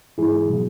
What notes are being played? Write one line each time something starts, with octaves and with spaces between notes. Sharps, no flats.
G#2 E3 G#3 E4 G#4
B2 F#3